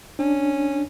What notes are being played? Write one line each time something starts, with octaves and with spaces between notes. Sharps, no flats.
C#4 D4